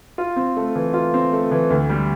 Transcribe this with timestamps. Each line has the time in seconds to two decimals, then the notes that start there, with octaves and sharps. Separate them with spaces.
0.18 F4
0.36 C4
0.57 A3
0.76 E3
0.94 F4
1.14 C4
1.33 A3
1.51 E3
1.70 D2
1.89 G3